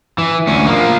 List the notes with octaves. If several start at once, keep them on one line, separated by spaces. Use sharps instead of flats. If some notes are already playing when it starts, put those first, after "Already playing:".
E3
D2 C#4
F3 A#3